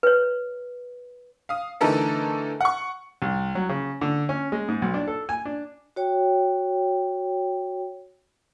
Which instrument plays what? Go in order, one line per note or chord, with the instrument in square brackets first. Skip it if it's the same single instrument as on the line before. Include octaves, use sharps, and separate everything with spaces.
[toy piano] B4 C#5
[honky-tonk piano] F5 D#6
D3 E3 A3 D#4 A4 A#4
F#5 C#6
[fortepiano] C2
F#3
C#3
D3
C#4
G#3
G#2
B1
D4
A4
G#5
D4
[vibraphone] F#4 C#5 G5